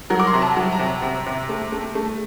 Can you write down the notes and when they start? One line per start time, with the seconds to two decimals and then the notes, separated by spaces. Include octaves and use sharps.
0.10 F#3 A#4
0.20 D6
0.27 C6
0.33 C3 A#5
0.42 A5
0.57 F#3
0.72 A#5
0.79 C3
1.02 C3
1.26 C3
1.49 A3
1.72 A3
1.95 A3